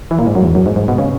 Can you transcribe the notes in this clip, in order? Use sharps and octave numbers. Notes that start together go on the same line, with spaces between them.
E3
A#2
G#2
F#2
E2
F#2
G#2
G#2
B2
C#3